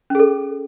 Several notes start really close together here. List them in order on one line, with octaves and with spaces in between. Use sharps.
C#4 G#4 A4